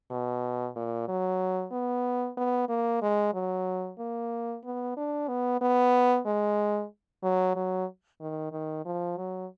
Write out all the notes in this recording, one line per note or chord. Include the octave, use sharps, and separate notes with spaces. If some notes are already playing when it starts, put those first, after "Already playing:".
B2
A#2
F#3
B3
B3
A#3
G#3
F#3
A#3
B3
D4
B3
B3
G#3
F#3
F#3
D#3
D#3
F3
F#3